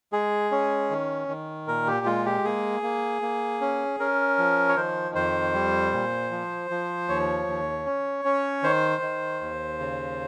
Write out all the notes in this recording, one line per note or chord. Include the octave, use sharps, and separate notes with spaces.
G#3 G#4
C#4
D#3
D#3
A#2 A#4
G4
G#3 F4
G4
A#3 G#4
A#3
A#3
C#4
C#4 A#4
F3
C#5
D#3 C5
F2 C5
G3
A#2
F3
F3
D#2 C#5
D#2
C#4
C#4
D#3 C5
D#3
D#2
C#3